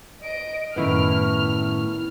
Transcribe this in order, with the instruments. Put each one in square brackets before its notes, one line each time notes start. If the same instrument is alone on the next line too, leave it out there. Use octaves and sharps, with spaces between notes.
[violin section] D#5 D7
[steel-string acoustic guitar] F#2 A2 D#3 [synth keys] B3 E4 C#6 [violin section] F6